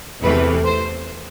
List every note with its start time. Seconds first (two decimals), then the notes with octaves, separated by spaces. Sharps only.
0.22 E2 C3 E3 A3 B4
0.64 C5